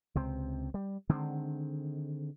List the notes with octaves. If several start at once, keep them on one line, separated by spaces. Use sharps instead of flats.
C#2 C3 C4
G3
D3 D#3 G#3 C4